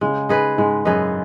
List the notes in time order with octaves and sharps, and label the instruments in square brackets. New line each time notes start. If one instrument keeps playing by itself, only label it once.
[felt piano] C#3 [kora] G#3
[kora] D#4 G#4 B4
[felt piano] G#2 [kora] G#3
[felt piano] F#2 [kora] D#4 G#4 B4